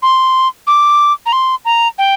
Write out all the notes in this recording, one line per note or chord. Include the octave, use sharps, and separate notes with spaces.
C6
D6
A#5
C6
A#5
G5